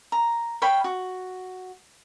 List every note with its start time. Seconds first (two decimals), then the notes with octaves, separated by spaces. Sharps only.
0.12 A#5
0.62 C#5 F5 G5 B5
0.84 F#4